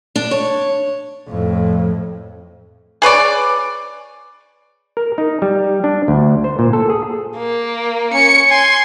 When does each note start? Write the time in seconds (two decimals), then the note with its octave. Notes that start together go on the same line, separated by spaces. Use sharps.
0.16 D4
0.31 C#5
1.28 F2 A2
3.02 G#4 B4 C#5 D5
4.97 A#4
5.18 D#4
5.42 G3
5.84 D4
6.08 D2
6.44 C5
6.59 A#2
6.73 A4
6.90 G#4
7.37 A#3
8.14 C#4 C#7
8.51 G#5 C6